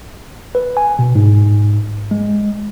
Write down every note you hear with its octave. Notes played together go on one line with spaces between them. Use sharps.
B4
G#5
B2
G#2
G#3